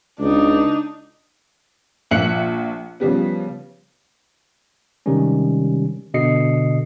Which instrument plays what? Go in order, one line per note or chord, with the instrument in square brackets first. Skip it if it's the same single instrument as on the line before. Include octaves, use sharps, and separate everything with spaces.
[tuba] C#2 [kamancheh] D4 D#4
[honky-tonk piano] A#1 F3 E5 F#6 C#7 F#7
C#3 F3 G3 B3
[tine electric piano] C3 D#3 G3 G#3 C#4
B2 D3 D#5 C7 C#7